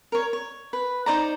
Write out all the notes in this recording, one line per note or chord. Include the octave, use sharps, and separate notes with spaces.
A#4 C#5
C#5
B4
D#4 C5 D5 A#5